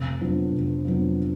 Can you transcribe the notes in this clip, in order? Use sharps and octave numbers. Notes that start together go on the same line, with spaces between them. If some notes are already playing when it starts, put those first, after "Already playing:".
Already playing: F1
F2 D3 F#3 B3
F1
F2 D3 F#3 B3